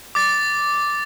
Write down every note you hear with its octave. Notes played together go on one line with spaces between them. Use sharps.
D6 A6